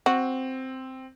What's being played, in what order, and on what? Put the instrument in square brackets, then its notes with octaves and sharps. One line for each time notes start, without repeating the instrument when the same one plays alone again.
[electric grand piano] C4 [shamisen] F#4